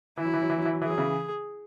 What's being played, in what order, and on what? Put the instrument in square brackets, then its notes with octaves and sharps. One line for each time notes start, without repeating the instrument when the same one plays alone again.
[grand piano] E3 [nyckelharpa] E4
[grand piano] F#3
E3
F#3
E3
F#3
E3
F#3
[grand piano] E3 [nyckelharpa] G#4
[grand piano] F#3
C#3 E3